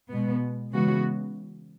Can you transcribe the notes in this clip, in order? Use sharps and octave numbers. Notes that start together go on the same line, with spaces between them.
B2 G#3 B3
C#3 E3 G#3 B3 F#4